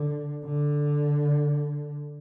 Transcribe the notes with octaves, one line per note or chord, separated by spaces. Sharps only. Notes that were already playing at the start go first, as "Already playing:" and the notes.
Already playing: D3
D3